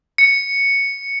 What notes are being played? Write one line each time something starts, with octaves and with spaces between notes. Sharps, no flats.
C#7